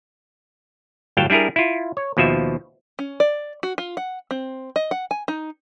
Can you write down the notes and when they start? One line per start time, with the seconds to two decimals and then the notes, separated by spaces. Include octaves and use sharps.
1.17 G1 A2 F#3 F5 G5 A5
1.30 G3 D4 E4 G#4 A#4
1.56 E4 F4
1.97 C#5
2.17 D#2 B2 F3 E5
2.99 C#4
3.20 D5
3.63 F#4
3.78 F4
3.97 F#5
4.31 C4
4.76 D#5
4.91 F#5
5.11 G#5
5.28 D#4